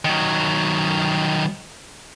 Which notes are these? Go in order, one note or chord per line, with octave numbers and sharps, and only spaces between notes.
D#3 F#3